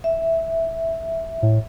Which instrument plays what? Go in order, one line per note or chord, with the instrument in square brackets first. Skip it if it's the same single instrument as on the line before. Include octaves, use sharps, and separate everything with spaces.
[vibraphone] E5
[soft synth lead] A2